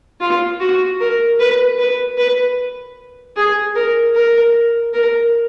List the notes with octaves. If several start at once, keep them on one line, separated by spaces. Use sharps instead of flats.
F4
F#4
A#4
B4
B4
B4
G#4
A#4
A#4
A#4